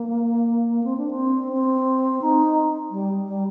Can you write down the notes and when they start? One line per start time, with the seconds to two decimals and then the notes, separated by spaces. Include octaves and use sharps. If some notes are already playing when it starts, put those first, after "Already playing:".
Already playing: A#3
0.84 C4
0.97 D4
1.11 C4
1.53 C4
2.22 D#4
2.91 G3
3.25 G3